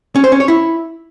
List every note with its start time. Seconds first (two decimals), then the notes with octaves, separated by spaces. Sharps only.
0.16 C#4
0.24 C5
0.32 C#4
0.40 C#5
0.48 E4